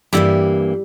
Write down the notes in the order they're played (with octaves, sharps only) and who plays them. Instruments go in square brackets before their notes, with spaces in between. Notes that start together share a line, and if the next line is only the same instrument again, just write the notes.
[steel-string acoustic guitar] G2 E3 A#3 [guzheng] G3 E4 G4